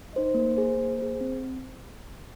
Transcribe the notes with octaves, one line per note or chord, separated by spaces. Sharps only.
D#4 C5 D#5
A#3
G#4 C5
A#3
G#4 C5
C4